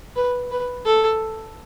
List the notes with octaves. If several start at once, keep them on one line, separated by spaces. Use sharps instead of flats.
B4
B4
A4